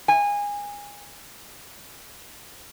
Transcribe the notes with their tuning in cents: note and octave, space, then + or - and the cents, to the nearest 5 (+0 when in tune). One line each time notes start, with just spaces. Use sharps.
G#5 -25